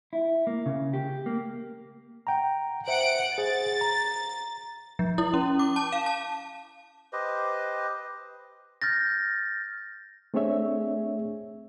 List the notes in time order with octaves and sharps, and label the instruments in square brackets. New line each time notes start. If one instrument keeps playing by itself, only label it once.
[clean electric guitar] E4
A#3
C#3
G4
A#3
[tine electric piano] F#5 G5 A#5
[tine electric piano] C5 E5 [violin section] F#5 D7
[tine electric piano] G#4 C5 F#5 [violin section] A6
[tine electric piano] A#5
[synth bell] F3
E4
C#4
D6
A5
F5
A5
[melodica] G4 B4 C5 D#5
[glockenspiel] F6 G6 A6 A#6
[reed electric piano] A3 C4 D4 G#4 C#5 E5